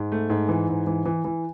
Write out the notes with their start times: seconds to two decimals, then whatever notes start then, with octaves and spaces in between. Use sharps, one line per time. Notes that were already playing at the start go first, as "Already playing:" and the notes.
Already playing: G#2
0.12 A3
0.30 G#2
0.49 E3
0.68 G#2
0.87 E3
1.05 E3
1.25 E3